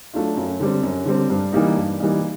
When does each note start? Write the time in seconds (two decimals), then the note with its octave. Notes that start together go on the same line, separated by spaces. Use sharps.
0.14 F#3 A3 D4 F4
0.37 F#2
0.60 D3 G3 C4
0.83 F#2
1.06 D3 G3 C4
1.30 G2
1.52 E3 G3 A#3 D#4
1.76 G2
1.99 E3 G3 A#3 D#4